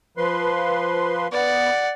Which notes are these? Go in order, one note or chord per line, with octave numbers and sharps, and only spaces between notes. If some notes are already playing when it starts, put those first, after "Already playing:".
F3 B4 C6
B3 D5 F#5